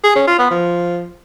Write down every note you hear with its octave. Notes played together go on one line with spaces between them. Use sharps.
G#4
C#4
F4
B3
F3